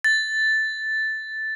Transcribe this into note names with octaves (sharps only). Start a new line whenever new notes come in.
A6